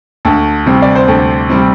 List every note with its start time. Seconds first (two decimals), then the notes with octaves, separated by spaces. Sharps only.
0.25 D2 A4
0.66 C3 G3 C4
0.82 D5
0.95 C5
1.08 D2 A4
1.50 C3 G3 C4